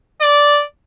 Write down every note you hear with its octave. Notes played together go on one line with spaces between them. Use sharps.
D5